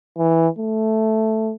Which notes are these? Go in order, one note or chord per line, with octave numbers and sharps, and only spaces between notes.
E3
A3